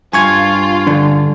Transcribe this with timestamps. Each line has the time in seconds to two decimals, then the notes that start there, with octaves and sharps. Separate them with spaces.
0.13 G2 F4 G#5 C#6 G#6
0.87 D3